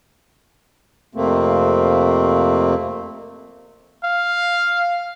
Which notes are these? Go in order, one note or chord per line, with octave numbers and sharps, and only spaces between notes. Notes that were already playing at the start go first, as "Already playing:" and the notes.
F2 C3 A3 A#3 C4
F5